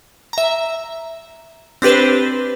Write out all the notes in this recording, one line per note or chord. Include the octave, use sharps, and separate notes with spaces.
E5 A#5
C4 D4 G4 B4 C5